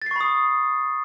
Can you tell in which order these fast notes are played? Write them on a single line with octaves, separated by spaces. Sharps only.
A6 C7 C#6 B5 D#6